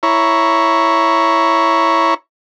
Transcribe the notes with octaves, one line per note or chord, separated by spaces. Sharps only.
E4 C#5 A#5